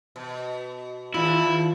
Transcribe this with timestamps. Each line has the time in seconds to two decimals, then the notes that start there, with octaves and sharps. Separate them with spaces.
0.16 B2
1.14 D#2 E4 F4